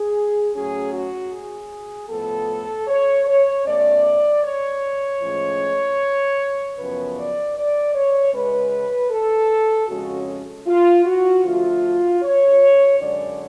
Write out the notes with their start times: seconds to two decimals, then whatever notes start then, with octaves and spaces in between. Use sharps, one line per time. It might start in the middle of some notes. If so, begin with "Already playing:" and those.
Already playing: G#4
0.53 A2 F#3 C#4 G#4
0.92 F#4
1.32 G#4
2.08 A2 F3 B3 A4
2.88 C#5
3.26 C#5
3.65 B2 A3 C#4 D5
4.42 C#5
5.21 A2 F3 G#3 C#4
6.76 F#2 C#3 F3 B3 B4
7.16 D5
7.55 D5
7.94 C#5
8.32 C#3 G#3 C#4 B4
9.10 A4
9.88 F2 C#3 G#3 C#4 F#4
10.66 F4
11.05 F#4
11.44 D3 F3 A3 F4
12.22 C#5
12.99 F#2 D3 G#3 D5